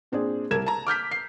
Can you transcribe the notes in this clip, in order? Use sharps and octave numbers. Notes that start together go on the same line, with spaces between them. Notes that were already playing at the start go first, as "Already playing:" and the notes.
A#2 C4 D4 G#4
C2 A#4 G#6 E7
A5 A#5
D6 F6 G6 B6
C7